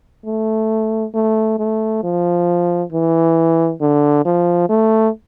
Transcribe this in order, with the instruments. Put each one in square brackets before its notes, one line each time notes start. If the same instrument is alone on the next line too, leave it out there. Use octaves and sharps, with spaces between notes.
[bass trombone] A3
A3
A3
F3
E3
D3
F3
A3